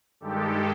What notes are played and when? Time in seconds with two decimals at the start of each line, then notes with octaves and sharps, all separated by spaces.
0.20 G2 D#3 G#3 G4 A4